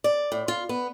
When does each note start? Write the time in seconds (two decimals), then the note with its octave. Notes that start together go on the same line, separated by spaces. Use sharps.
0.04 D5
0.32 A2
0.48 F4
0.69 B3